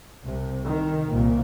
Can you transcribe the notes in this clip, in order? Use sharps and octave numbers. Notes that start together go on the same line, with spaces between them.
C2 C3
D#3
C2 A#2 A#3